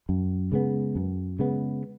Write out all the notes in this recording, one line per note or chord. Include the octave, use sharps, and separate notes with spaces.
F#2
C#3 G#3 B3
F#2
C#3 G#3 B3